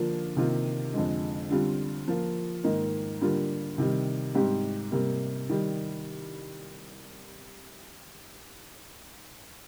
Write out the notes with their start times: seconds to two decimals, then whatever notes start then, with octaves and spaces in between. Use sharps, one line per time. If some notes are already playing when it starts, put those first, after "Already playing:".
Already playing: D3 F3 A#3 D4 F4
0.37 C3 D#3 A#3 F4
0.93 F2 D3 G#3
1.50 D3 G3 C4 F4
2.08 F3 A#3 F4
2.64 G#2 D#3 A#3 D#4
3.21 D3 G3 A#3 F4
3.78 C3 D#3 G3
4.35 G#2 G3 C4 G4
4.92 C3 G3 A#3
5.50 D#3 G3